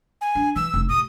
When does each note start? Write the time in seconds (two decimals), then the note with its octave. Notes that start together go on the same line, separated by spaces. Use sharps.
0.21 G#5
0.35 D4
0.56 E3 E6
0.74 F1 D#4
0.89 A1 D#6